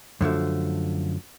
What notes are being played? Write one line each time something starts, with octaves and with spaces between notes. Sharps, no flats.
F#2 D3 F3 A3